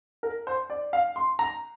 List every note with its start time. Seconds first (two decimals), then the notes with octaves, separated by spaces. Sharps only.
0.23 A#4
0.47 C5
0.70 D5
0.93 F5
1.16 C6
1.39 A#5